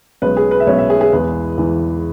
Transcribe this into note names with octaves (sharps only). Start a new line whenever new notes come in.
B1 B2 G#3 C#4 B4
G#4
B4
E5
B1 B2 G#3 C#4 C#5
E5
G#4
G#4
E2 E3 G#3 B4
E2 E3 G#3